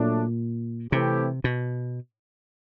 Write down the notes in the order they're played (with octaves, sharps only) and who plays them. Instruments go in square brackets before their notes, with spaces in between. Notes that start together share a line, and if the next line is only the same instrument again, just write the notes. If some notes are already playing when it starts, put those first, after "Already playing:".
Already playing: [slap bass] A#2 [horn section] F#3 A3 D4
[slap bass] C3 [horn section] E3 A3 C4 E4 G4
[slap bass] B2